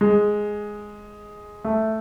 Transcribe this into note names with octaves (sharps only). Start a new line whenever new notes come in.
G#3
A3